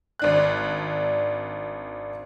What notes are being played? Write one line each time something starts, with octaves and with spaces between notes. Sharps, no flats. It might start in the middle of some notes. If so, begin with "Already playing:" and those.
G#1 D4 F#6